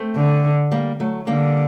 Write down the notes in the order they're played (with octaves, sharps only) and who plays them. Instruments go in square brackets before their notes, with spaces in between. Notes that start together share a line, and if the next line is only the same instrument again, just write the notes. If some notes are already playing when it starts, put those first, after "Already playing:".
Already playing: [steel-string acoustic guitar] A3 C4
[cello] D3
[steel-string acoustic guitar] G3 A#3
F#3 A3
[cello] D3 [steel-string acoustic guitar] G3 A#3